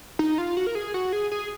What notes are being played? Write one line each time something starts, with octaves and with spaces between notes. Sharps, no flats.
D#4
F4
F#4
A#4
G#4
F#4
G#4
G#4